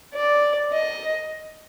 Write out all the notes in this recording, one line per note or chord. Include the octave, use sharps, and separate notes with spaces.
D5
D#5